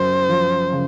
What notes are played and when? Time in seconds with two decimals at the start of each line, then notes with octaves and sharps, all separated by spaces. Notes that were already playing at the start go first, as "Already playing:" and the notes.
Already playing: F#2 C#3 C5
0.29 F3
0.72 C#3